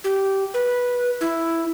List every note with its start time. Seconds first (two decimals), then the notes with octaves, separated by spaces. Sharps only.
0.04 G4
0.54 B4
1.21 E4